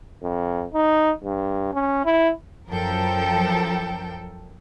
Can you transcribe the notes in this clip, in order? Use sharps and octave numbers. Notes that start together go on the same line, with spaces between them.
F2
D#4
G2
C#4
E4
F#2 F3 A4 A#4 G5